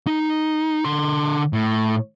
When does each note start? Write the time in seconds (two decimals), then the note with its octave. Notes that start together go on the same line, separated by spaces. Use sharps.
0.07 D#4
0.85 D3 C6
1.53 A2